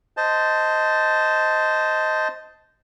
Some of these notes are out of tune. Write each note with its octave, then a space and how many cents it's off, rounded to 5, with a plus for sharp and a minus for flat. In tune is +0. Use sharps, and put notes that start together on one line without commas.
C5 -10 D#5 +5 A5 +0